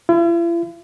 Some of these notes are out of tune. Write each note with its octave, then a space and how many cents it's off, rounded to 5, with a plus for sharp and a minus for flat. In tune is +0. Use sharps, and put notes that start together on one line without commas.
E4 +45